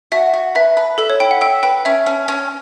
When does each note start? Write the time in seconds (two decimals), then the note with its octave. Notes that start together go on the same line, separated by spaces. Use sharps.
0.12 F#4 E5
0.34 F#4
0.55 B4 E5
0.77 B4
0.98 A4 E5
1.10 C#5
1.20 E4 G5
1.31 F#5
1.41 E5 G5
1.63 B4 G5
1.85 C#4 E5
2.06 C#4
2.28 C#4